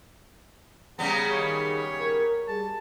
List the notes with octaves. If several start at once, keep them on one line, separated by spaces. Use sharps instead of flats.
C#3 G3 B3 G#4 A#5
D#3 G#4 C#5
A#4
G3 G#4 A5